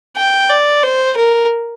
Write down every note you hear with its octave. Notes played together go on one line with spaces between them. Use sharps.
G5
D5
C5
A#4